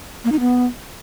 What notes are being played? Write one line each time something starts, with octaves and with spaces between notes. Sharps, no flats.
A#3
D#4
B3